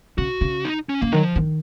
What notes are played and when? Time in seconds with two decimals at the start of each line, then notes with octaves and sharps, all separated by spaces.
0.18 C#3 F#4
0.41 C#3
0.65 D#4
0.89 C#4
1.01 C#3 A#3
1.12 D#3 F#3
1.24 F3
1.36 D#3